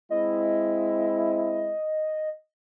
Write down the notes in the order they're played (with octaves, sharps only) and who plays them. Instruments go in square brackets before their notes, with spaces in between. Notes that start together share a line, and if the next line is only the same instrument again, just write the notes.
[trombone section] G#3 C4 E4 [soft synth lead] D#5